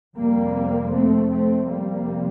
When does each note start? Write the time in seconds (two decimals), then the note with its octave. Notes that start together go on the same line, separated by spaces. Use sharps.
0.16 F2 C3 G3 A#3
0.92 A3 C4
1.29 A3 C4
1.66 F2 C3 G3 A#3